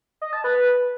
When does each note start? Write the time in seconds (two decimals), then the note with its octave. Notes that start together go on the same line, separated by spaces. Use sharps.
0.22 D#5
0.33 A5
0.44 B4